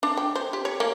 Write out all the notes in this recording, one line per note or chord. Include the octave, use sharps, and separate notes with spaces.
D4
G5
C5
G4
C#5
A#3